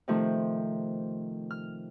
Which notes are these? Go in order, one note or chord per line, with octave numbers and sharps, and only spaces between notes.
C3 D#3 F3 A3
F6